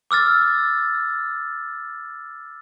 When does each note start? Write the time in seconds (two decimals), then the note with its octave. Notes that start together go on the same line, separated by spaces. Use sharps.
0.11 D6 E6 F6 A6